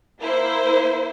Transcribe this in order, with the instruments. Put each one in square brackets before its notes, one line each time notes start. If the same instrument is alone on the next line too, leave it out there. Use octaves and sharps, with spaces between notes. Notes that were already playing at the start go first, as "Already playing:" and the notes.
[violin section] A#3 E4 C5